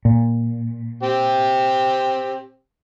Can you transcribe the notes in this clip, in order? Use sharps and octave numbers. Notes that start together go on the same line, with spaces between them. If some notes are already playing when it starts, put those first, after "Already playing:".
A#2
C4 G4